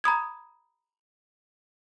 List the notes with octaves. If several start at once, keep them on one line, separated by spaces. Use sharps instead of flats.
A#5 B5 D#6 G#6